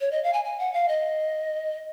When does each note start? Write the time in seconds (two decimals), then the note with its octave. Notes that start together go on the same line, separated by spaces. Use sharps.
0.01 C#5
0.11 D#5
0.24 F5
0.33 G#5
0.45 G#5
0.59 F#5
0.73 F5
0.88 D#5